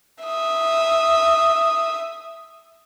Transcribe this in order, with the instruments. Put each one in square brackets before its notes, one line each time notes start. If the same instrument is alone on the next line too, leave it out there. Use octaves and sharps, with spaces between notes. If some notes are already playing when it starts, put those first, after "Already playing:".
[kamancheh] E5 D#6